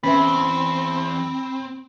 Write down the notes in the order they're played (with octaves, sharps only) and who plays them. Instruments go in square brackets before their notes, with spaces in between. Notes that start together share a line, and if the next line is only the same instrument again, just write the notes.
[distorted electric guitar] E2 [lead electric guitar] C4 [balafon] C#4 B4 E5 [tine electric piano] B5